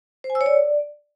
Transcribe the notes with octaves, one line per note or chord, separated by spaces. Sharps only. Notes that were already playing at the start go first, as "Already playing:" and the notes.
C5
G#5
E6
C#5
D5